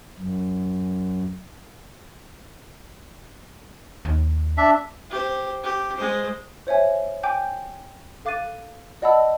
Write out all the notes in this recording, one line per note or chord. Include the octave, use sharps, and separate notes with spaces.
F#2
D#2
D4 E5
G4 C5
G4
G#3 C5
C5 C#5 E5 G#5
G5 G#5 D6 G6
A4 F5 D6 F#6 A6 D#7
D5 D#5 F#5 A5 B5 E6